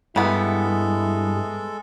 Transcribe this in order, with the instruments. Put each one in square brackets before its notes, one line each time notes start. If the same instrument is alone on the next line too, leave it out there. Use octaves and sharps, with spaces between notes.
[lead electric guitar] G2 [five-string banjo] E3 B3 [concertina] G#3 A4 [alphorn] E4